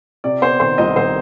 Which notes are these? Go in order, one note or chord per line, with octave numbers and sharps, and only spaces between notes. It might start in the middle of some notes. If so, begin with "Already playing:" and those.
C3 D5
B3 C5
D#3 C5
C2 D#5
D#3 C5